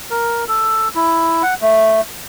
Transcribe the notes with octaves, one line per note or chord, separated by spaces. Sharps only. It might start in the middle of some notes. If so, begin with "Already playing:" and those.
A#4
A4
E4
F#5
A3